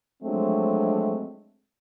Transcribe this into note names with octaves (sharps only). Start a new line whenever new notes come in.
F3 F#3 G#3 A3 C4 D4